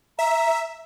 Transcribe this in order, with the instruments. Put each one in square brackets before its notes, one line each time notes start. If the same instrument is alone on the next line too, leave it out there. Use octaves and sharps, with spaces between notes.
[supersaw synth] E5 [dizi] A#5